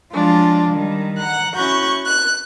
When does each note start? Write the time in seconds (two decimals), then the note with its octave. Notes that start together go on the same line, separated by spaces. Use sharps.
0.12 F3 F#3 G#3 D4 F4
0.70 D#3 G3
1.18 F#5 A#5 F#6
1.56 C#4 E4 F#4 C#6 F#6 G6
2.07 F#6